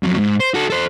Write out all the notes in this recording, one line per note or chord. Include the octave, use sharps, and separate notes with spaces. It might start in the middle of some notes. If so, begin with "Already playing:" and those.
F2 F#3
G#2
C5
F#4 A4
A4 C5